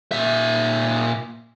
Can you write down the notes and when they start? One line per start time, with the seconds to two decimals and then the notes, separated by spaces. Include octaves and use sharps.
0.12 A#2 E5